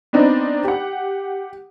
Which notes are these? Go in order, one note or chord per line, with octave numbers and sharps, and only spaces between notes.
B3 C4 D4 D#4
G4 F#5